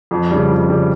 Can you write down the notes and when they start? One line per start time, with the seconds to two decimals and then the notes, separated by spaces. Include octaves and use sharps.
0.11 F2
0.31 C#3 G3
0.49 F2
0.69 C#3 G3